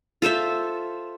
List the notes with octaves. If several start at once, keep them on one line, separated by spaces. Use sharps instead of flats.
F4 A4 C5 E5